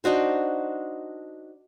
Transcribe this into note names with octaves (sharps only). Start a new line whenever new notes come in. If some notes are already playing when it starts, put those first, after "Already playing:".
D4 D#4 F#4 C5